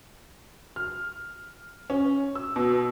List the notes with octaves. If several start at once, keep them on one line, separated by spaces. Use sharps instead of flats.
F6
C#4
E6
B2